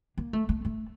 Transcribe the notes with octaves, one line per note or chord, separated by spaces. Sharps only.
A#3
A3
A3
A3